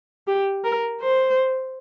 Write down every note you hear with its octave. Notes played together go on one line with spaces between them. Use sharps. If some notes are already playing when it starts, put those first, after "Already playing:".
G4
A#4
C5